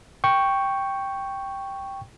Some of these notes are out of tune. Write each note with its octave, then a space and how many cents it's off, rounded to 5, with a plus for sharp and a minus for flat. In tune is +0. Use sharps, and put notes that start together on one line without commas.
G5 +0 C#6 +0